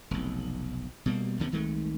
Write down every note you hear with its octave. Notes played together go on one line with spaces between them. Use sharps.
F1 B1
B2 G3 A#3
D#2 C3 D#3 B3
C2 D#3 G#3 A3